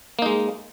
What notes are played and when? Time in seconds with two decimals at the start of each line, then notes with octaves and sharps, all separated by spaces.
0.19 A#3
0.22 D#4
0.26 G#3